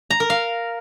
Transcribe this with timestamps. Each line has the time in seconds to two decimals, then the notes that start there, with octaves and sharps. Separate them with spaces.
0.10 A#5
0.20 A#4
0.30 F5